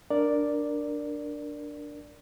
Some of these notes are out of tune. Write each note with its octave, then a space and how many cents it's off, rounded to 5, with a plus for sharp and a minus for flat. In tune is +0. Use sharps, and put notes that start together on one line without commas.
D4 +0 A#4 +0 D5 +0